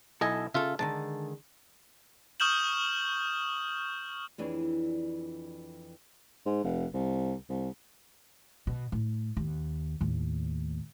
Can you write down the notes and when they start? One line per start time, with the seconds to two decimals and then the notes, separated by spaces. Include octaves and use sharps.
0.21 B1 E4 A4 D#5 G#5
0.54 C#3 F4 A4 E5
0.79 D3 D#3 G#3 A5
2.40 C#6 D#6 F6 G6 E7 F#7
4.38 F2 E3 D4 G#4 C#5
6.45 G#2
6.63 F1
6.93 C2
7.49 C2
8.67 B2
8.92 A2
9.37 D#2
10.01 D#2 A2